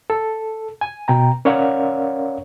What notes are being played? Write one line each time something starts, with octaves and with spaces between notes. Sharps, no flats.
A4
G#5
B2 G5 A#5
C#4 A#4 C#5 D5 F5 F#5